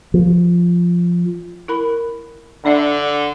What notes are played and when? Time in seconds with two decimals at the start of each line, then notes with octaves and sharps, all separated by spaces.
0.14 F3
1.68 E4 A#4 B5
2.65 D3 D4 D5 E5